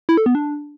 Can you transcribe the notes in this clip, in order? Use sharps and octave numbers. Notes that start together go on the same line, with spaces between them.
E4
A4
B3
D4